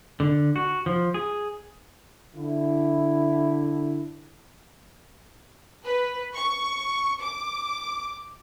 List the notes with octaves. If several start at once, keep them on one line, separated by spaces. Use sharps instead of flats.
D3
F#4
F3
G#4
D3 E4
B4
C#6
D6